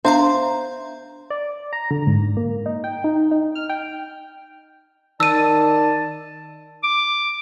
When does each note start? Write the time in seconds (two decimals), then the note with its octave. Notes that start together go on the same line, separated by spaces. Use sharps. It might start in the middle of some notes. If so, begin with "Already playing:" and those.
0.05 B3 D4 C5 E5 F5 A#5
1.30 D5
1.73 A#5
1.91 D3
2.07 G#2
2.37 A#3
2.66 D#4
2.84 G5
3.04 D#4
3.31 D#4
3.55 F6
3.70 G5
5.20 D#3 D5 A5 E6 D#7
6.84 D6